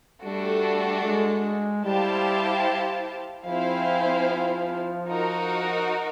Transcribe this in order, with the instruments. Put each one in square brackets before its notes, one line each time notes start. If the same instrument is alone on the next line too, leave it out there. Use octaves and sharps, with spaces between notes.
[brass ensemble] G3 [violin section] A3 D4 F#4 A4
[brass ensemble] G#3
[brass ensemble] G3 [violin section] E4 G4 C5 F5 A5
[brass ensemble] F3 [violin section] C4 E4 G#4 C5 F5
[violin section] D#4 F#4 A#4